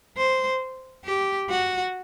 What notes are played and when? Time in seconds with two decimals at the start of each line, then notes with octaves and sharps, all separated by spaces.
0.17 C5
1.05 G4
1.50 F#4